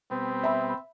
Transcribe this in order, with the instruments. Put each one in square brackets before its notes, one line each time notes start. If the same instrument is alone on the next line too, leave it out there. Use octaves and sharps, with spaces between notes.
[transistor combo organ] B2 G3 B3 [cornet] C4
[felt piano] E5 B5